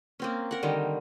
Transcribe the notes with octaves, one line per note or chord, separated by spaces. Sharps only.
A#3 C4 C#4
A#4 F#5
D3 D#3 G3